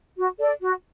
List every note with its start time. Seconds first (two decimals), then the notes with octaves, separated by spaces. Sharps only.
0.17 F#4
0.39 A4 D5
0.61 F#4